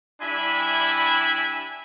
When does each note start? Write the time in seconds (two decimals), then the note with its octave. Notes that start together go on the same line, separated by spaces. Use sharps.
0.21 G3 D4 E4 E5 G#5 B5